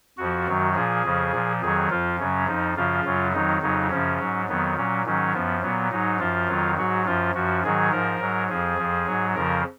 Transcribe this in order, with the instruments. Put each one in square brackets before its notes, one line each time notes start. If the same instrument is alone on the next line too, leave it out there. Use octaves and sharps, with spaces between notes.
[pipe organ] F2 F3 F#4
F#2 D#3 F#3
A#2 F3 G#4
F2 C#3 F3
A#2 F3
F2 D#3 F#3 G#4
F2 F3 F4
F#2 C#3 F#3 C#4
F2 F3 D#4
F#2 C#3 F3 F4
F#2 C#3 F#3
F2 D#3 F#3 D#4
F2 C#3 F#3 D#4
F#2 C#3 F3 C#4
G#2 F#3
F2 D#3 F#3 B3
A#2 F#3 C#4
G#2 D#3 F#3 C#4
F#2 F3 B3
A#2 F#3 B3
G#2 F#3 D#4
F#2 F3 F4
F2 D#3 F#3
G#2 F#3 F#4
F#2 F3 F4
F#2 F3 F#4
G#2 D#3 F#3 G#4
G#2 F3 A#4
G#2 F#3
F2 F3 G#4
F2 F3
G#2 F#3
F2 C#3 F3 A#4